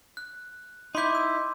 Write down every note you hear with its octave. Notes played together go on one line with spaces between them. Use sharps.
F#6
D#4 E4 C6 D6 G6
E6